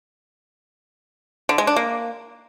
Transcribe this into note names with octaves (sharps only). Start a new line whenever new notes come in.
D3
G#3
D4
A#3